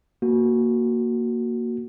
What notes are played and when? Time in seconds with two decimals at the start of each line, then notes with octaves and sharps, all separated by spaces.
0.22 A#3 F#4